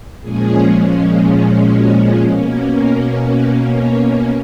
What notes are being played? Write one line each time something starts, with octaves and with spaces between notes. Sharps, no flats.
A#2 F3 G#3 C#4 G#4
F#4
B2 A#3 C#4
A#4
B4
C#5